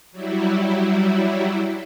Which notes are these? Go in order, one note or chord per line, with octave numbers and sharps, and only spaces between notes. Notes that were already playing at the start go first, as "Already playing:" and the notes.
F#3 G3 E4